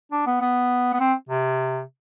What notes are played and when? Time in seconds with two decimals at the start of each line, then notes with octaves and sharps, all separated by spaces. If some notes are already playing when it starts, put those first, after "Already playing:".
0.12 D4
0.27 B3
0.41 B3
0.94 B3
1.00 C4
1.29 C3